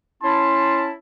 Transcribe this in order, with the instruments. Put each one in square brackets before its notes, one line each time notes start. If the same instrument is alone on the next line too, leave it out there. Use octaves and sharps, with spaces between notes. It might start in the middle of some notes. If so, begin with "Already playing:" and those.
[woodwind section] C#4 E4 A5 [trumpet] C6